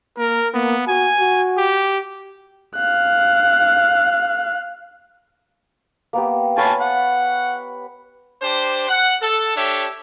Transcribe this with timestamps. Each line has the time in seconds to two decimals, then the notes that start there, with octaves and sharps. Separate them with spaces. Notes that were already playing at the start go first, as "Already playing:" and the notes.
0.17 A#3 A#4
0.54 A#3 B3
0.88 F#4 G#5
1.19 F#4
1.57 G4
2.76 F5 F#6
6.13 A#3 B3 G4
6.58 B4 C#5 F5 G#5 A5
6.81 F#5
8.42 D4 G4 C5
8.89 F#5
9.22 A4
9.56 D4 G4 A4 C#5 E5